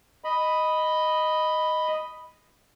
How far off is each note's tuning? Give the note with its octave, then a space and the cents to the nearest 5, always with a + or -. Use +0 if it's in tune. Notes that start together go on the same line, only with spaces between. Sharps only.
D#5 +0 B5 +0